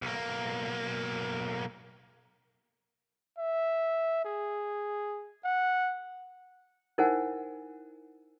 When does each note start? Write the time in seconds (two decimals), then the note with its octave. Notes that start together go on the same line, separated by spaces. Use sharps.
0.02 B1 A#3
3.38 E5
4.25 G#4
5.44 F#5
6.98 D#4 E4 A#4 C5 F#5 G#5